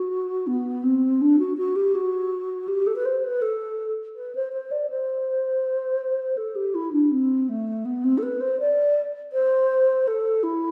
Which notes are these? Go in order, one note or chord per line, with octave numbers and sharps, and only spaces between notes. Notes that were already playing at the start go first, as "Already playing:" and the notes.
Already playing: F#4
B3
C4
D4
F#4
F#4
G4
F#4
G4
A4
B4
C5
B4
A4
B4
C5
C5
D5
C5
A4
G4
E4
D4
C4
A3
B3
C4
A4
B4
C5
D5
C5
A4
E4